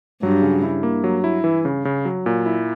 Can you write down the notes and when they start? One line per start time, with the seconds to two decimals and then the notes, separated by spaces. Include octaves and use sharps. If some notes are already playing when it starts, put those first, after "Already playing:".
0.23 G2 F#3
0.43 C#3
0.63 E4
0.83 A#3
1.04 F#3
1.24 E4
1.44 E3
1.65 C#3
1.85 C#3
2.05 F#3
2.26 A#2
2.46 E4